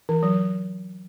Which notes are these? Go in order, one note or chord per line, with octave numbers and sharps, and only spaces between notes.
E3
F#3